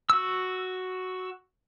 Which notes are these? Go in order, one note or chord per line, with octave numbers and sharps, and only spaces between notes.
F#4 E6